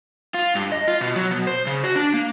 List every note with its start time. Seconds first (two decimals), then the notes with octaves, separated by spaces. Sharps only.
0.34 F4
0.55 G2
0.72 D#5
0.88 F4
1.01 B2
1.15 F#3
1.31 B2
1.47 C5
1.67 C#3
1.84 F#4
1.96 D4
2.14 A#3